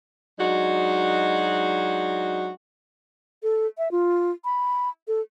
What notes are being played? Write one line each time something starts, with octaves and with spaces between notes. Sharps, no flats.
F#3 G#3 D4 D#4 F#4
A4
E5
F4
B5
A4